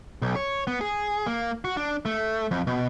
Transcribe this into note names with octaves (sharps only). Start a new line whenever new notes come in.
B1
C#5
B3
G#4
A#3
F#4
D4
A3
F2
B2